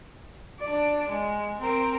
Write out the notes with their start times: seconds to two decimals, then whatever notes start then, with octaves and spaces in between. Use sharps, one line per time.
0.60 D4 D5
1.09 G#3
1.59 C4 A#4